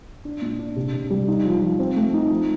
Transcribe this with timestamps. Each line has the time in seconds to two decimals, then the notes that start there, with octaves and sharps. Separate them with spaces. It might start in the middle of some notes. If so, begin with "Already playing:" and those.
0.25 D4
0.42 A#2
0.59 D4
0.76 C3
0.93 C3
1.10 G3
1.28 D#4
1.45 F3
1.61 F3
1.79 C4
1.96 A3
2.14 D#4
2.30 F3